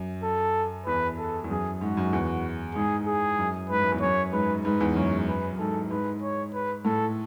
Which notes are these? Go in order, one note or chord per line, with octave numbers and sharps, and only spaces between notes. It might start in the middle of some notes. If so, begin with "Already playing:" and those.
Already playing: F#2
A4
E2 B4
A4
E2
F#2 G#4
G#2 F#4
F#2
E2
G#2 G#4
G#4
F#2
G#2 B4
F#2
E2
F#2 C#5
G#2 B4
G#2 B4
E2
F#2 C#5
B4
F#2
G#2 A4
G#2 B4
C#5
B4
A2 A4